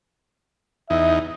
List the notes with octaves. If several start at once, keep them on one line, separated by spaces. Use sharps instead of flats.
E2 D#4 E5